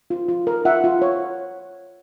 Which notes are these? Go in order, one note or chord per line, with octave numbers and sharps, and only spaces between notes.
F4
F4
A#4
F4 E5 F#5
F4
C#5